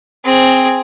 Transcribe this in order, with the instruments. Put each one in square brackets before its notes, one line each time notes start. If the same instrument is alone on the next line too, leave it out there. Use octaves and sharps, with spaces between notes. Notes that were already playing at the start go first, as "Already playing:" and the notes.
[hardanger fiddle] C4 G#4